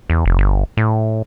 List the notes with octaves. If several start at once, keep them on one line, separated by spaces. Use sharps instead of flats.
E2
F1
G1
A2